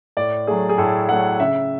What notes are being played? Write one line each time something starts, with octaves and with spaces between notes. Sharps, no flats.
A2 D5
F#3 A3 G#4
G#4
A2 A4
F#3 A3 F#5
C#3 E5